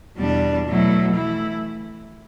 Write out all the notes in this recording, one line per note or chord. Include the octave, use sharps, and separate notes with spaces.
E2 B2 G3 D4
B2 F#3 A3 E4
E3 A3 E4